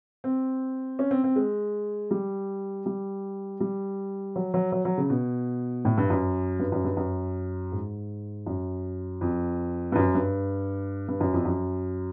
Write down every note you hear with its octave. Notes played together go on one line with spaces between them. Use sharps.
C4
C#4
C4
C4
G#3
G3
G3
G3
F#3
F#3
F#3
F#3
C#3
B2
A2
G2
F#2
G2
F#2
G2
F#2
G#2
F#2
F2
G2
F#2
G2
G2
F#2
F2
F#2